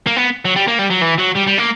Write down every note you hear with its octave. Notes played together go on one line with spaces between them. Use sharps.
A#3
B3
F#3
G3
A#3
G3
F#3
E3
F#3
G3
G3
A#3